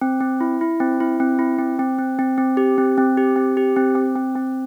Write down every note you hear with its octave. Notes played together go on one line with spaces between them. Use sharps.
C4
C4
E4
E4
C4
E4
C4
E4
C4
C4
C4
C4
C4
G4
C4
C4
G4
C4
G4
C4
C4
C4
C4